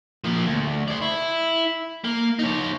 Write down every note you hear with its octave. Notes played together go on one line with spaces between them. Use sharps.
F3 A#3
D2
C5 D5
E4
A#3
D#4 C#5